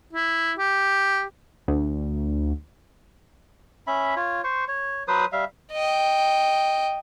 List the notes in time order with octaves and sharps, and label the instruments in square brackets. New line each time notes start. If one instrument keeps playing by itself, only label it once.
[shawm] E4
G4
[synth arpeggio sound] D2
[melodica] C#4 E5 B5
F4 C#5
C5 C#6
C#5
F#3 B4 C5 D#6
G3 E5 F5
[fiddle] D#5 G5